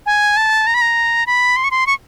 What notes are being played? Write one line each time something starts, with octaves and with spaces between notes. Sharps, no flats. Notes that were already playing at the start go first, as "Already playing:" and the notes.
G#5
A5
A#5
B5
A#5
B5
C6
C#6
C6
C#6